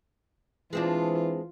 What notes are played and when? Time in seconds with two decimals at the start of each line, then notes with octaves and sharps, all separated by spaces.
0.73 E3 G#3 C4 D4 F4